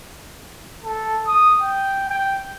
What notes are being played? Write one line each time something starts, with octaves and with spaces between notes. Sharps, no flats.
A4
D#6
G5
G5